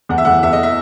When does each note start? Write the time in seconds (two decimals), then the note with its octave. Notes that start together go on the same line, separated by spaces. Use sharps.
0.09 E2 F#5
0.18 E5
0.25 E2 F#5
0.43 E2 E5
0.53 D#5
0.63 E5